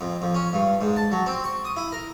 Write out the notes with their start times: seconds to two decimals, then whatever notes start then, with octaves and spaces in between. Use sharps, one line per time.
0.01 F2
0.22 F2
0.35 C#4
0.53 G2
0.81 G#2
0.97 A5
1.12 F#3
1.26 C4
1.44 C#6
1.65 D#6
1.77 E4
1.92 A#4